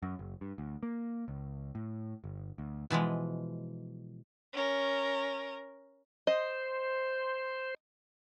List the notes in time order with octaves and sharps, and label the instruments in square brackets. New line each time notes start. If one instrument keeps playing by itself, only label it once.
[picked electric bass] F#2
F#1
G2
D2
A#3
C#2
A2
G1
D2
[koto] B2 E3 F3 G#3
[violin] C#4 A#4
[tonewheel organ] C5 [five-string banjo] D#5